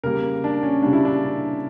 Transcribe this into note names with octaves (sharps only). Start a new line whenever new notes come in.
C#3 G3 A#3 A#4
D4
C#4
C#3 G3 A#3 D4
E4
D4